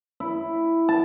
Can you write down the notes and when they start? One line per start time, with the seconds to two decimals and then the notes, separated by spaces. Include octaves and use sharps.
0.20 E4
0.89 A5